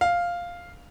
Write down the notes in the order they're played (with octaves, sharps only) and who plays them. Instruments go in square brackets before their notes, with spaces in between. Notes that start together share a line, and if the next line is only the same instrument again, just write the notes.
[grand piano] F5